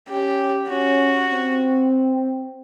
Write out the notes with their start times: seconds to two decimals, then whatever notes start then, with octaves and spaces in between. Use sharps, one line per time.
0.09 C#4 G4
0.69 C#4 F#4
1.30 C4